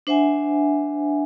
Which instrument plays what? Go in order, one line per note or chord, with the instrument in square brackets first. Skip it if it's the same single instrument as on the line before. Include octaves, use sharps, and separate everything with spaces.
[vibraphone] D4 C5 E5 F#5 G#5